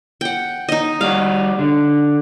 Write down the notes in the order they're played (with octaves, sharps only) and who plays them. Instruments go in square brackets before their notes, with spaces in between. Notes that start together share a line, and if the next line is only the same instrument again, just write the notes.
[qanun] F#5 G5
D#4 D#5
[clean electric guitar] G3 F#4 [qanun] F5
[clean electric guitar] D3